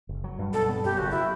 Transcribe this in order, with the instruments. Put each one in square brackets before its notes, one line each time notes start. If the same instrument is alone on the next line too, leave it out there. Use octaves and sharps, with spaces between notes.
[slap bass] F#1
F#3
G2
[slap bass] B2 [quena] A4
[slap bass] B3
[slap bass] F#2 [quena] G4
[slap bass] F#1 [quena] F#4
[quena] E4